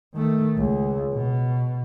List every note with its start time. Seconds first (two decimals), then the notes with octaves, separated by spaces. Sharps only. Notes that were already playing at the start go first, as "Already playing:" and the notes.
0.14 D#3 A3
0.56 C#2
1.13 B2